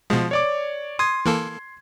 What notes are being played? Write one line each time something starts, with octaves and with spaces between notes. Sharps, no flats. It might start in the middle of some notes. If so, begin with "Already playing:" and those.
B2 F3 G#3
C#5 D5 D6
C6 D#6 G#6
E3 A#3 A4